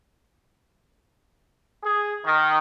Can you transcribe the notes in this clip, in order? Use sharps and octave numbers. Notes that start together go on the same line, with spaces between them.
G#4
D#3